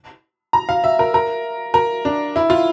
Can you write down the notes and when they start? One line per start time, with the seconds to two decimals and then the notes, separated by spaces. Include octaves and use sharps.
0.53 A#5
0.69 F5
0.84 E5
0.99 A#4
1.14 A#4
1.74 A#4
2.05 D4
2.36 E4
2.50 F4